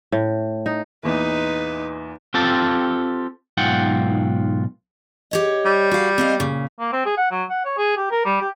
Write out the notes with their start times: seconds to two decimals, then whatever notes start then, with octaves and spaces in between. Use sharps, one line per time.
0.12 A2
0.66 D#4
1.03 E2 A#2 E3 D#4 B4
2.34 C4 F4 G4 A4 A5
3.57 B1 G#2 F4 F#5 G5
5.31 G4 C#5 D#5
5.65 G3
5.91 F#4 F5
6.18 C4 D#5 F5
6.40 A#2 C#3
6.79 A#3
6.93 C4
7.05 G#4
7.17 F#5
7.31 F#3
7.50 F#5
7.65 C#5
7.78 G#4
7.97 G4
8.11 A#4
8.25 G3
8.41 G4